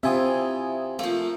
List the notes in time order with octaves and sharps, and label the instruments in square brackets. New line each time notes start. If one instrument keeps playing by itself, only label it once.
[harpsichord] C3 F4 [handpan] C4 [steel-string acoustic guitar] E4 [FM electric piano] E5 G#5 D#6
[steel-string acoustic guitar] F3 A3 [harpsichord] A#3